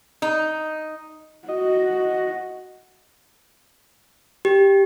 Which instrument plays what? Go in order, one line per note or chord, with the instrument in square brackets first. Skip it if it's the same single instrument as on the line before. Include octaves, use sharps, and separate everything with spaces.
[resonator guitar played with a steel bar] D#4
[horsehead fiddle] F#4 [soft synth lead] D#5
[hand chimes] G4